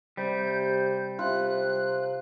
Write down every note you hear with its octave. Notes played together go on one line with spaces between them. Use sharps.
C3 G3 G6
C3 F4 F#6